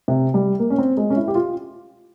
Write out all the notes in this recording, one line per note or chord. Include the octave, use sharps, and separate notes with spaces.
C3
G3
A#3
C#4
C4
G#3
C#4
E4
G4
F4